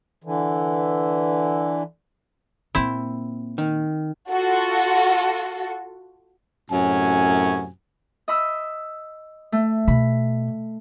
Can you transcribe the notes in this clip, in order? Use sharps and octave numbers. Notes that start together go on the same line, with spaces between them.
D3 E3
A#2 A#3 C4 E4
D#3
F4 F#4 A4
F#2 A2 C3 F#3 C#4 G#5
D#5 B5 E6
A3
B2 B5